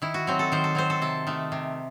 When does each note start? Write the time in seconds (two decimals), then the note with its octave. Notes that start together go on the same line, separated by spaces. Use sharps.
0.02 D#3 E4
0.14 F#4
0.27 F#3 C4
0.39 A4
0.52 D#3 C5
0.64 A4
0.75 F#3 C4 C5
0.90 A4
1.01 C3 A4
1.27 D#3 A3
1.52 C3